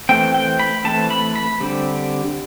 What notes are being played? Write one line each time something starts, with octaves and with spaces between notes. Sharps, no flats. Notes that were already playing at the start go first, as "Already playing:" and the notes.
E3 A3 C4 G5
G5
B5
E3 A3 C4 A5
B5
B5
D3 G3 C4